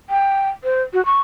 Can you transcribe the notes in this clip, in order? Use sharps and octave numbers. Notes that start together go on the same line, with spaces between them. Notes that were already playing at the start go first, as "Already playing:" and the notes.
G5
C5
F#4
C#6